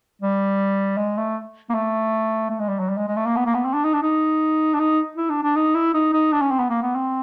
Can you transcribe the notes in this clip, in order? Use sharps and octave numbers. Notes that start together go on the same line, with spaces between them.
G3
G#3
A3
A#3
A3
A3
G#3
G3
F#3
G3
G#3
G#3
A3
A#3
B3
A#3
B3
C4
D4
D#4
D4
D#4
D4
D#4
E4
D4
D4
D#4
E4
D#4
D#4
D4
C#4
C4
B3
A#3
B3
C4